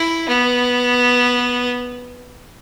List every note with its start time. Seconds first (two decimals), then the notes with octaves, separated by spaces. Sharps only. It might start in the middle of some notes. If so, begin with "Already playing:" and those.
Already playing: E4
0.28 B3